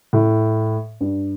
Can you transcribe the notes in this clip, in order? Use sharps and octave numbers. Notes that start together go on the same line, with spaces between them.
A2
G2